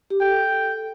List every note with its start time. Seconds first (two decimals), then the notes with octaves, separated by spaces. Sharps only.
0.10 G4
0.21 A4 G5